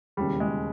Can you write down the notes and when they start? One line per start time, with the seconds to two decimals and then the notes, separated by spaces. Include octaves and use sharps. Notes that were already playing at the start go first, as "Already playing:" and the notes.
0.17 E1 D#2 C#3 G3
0.40 G#3